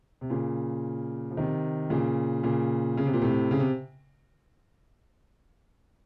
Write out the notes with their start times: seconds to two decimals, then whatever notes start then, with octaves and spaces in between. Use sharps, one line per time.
0.21 C3
0.30 A#2 C#3
1.31 F3
1.37 C3 D#3
1.90 A#2 C#3
2.43 A#2 C#3
2.97 C#3
3.06 C3
3.13 A#2
3.22 A2 C3
3.51 C#3
3.59 C3